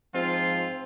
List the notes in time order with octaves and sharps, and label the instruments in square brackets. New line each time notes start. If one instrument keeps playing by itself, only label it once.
[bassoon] G#2 [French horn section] F3 [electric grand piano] C4 [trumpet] F4